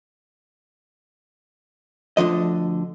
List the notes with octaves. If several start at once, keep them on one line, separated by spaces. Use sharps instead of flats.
D2 D3 F3 D#5